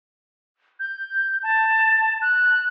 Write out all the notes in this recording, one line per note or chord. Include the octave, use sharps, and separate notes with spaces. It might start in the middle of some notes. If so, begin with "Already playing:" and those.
G6
A5
F#6